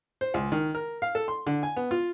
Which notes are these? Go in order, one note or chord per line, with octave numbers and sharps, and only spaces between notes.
C5
C#2
D#3
A#4
F5
A4
C6
D3
G#5
B3
F4